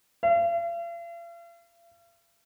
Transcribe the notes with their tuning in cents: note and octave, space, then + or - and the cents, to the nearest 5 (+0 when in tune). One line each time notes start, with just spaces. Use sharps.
F5 -45